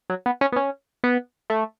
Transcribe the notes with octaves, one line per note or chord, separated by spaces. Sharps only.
F#3
B3
C#4
B3
C#4
B3
A3